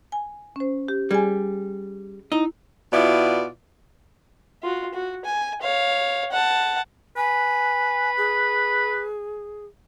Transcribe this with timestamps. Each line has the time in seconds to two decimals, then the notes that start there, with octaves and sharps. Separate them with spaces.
0.12 G#5
0.56 C#4 C5
0.88 G4
1.11 G3 G#4 G#5
2.32 D#4 E4
2.92 B2 B3 E4 F4 D5
4.63 F4 F#4
4.94 F#4
5.25 G#5
5.62 C#5 F5
6.32 F#5 A5
7.17 B4 G#5
8.17 G#4